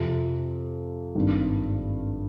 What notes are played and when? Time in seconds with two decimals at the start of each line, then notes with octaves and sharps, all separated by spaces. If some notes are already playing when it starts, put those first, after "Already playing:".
Already playing: F2 C3 F3
1.15 G#1 G2 D#3